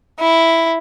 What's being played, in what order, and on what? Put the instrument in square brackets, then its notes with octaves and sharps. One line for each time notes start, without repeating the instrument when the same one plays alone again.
[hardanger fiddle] E4